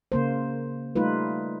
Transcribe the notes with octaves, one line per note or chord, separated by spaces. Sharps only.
C#3 A#3 C5
G3 A3 D#4 F4 B4